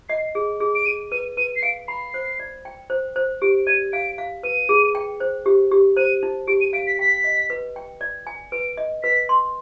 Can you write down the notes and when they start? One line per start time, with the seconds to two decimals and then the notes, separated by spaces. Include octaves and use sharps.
0.09 D#5 C7
0.35 G#4
0.60 G#4
0.75 D7
0.86 G#4 D#7
1.12 B4 D#7
1.37 B4 D#7
1.56 C7
1.63 F5 D7
1.88 B5 C7
2.14 C5
2.39 D5
2.65 G5
2.90 C5
3.16 C5
3.42 G4 D7
3.67 D5 D#7
3.93 F5 D7
4.18 F5
4.43 B4 D#7
4.69 G#4
4.95 G5
5.20 C5
5.46 G4
5.72 G4
5.97 C5 D#7
6.23 D#4
6.48 G4 D7
6.61 D#7
6.73 F5 D7
6.87 B6
6.99 G5 B6
7.24 D#5
7.50 B4
7.76 G5
8.01 D5
8.27 G#5
8.52 B4 D7
8.77 D#5
9.03 B4 B6
9.29 C6